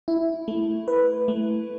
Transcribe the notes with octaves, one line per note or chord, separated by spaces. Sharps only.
E4
A3
B4
A3